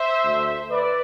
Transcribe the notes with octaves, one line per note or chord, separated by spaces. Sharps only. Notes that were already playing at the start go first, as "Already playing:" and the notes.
Already playing: C5 E5
D2 D3 A3
B4 D5